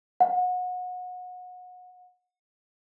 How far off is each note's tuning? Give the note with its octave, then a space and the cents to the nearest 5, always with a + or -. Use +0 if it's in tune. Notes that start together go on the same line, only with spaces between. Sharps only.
F#5 -30